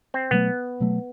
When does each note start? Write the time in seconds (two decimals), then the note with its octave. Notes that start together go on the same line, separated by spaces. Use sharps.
0.14 C4
0.31 B2 F#3 A3 B3
0.80 B2 F#3 A3